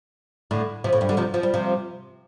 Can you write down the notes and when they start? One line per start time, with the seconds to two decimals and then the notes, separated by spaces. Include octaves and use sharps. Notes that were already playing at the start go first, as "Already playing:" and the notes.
0.51 A2 D3
0.84 C3 F3
0.93 A2
1.01 G2
1.09 D3 G3
1.17 C3 F3
1.34 F3
1.43 G3
1.54 C3 F3